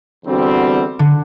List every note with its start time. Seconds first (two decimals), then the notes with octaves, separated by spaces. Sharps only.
0.24 E2 D3 G3 C4 F#4
0.99 D3